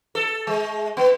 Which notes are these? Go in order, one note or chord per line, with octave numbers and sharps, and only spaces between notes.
A4
G#3
B3